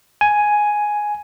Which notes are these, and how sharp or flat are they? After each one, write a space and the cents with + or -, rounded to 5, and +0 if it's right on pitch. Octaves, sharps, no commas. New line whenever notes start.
G#5 +5